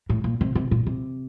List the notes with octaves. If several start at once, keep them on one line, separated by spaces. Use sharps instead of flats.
A2
A#2
C3
C3
A#2
C3